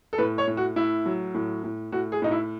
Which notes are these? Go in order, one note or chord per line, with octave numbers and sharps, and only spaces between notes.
A4
A2 B4
C#5
A2
F#4
A2 E4
F#3
A2
A2
A2 F#4
G#4
A2 D#4
E4